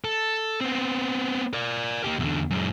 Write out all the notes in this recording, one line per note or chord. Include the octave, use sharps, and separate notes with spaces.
A4
B3 C4
A#4 D5
A#3 G4
E2 D3
F#2 G#3